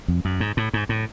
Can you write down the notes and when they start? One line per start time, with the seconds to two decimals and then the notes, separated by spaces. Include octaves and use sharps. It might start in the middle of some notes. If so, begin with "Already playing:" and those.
0.08 F2
0.25 F#2
0.40 G#2
0.57 A2
0.74 G#2
0.89 A2